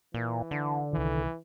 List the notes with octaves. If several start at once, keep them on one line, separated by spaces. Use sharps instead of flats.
A#2 E3
D3
C2 D#3 E3